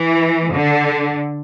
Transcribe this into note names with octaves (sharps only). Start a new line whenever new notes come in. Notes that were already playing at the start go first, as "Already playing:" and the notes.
Already playing: E3
D3